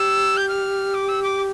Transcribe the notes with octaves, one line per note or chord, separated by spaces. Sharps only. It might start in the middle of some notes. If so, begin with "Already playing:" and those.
Already playing: G4 E6
G6
F6
D6
E6
D6